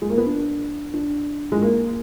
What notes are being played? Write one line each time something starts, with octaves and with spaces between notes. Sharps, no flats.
G#3
A#3
B3
D4
D4
G#3
A#3